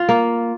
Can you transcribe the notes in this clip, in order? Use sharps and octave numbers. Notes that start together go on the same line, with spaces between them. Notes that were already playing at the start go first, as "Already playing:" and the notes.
Already playing: F4
A#3